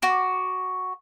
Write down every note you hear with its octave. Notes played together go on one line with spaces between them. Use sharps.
F#4 D6